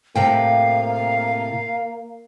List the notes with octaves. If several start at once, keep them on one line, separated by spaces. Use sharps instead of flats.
A2 C3 A#3 F5 G5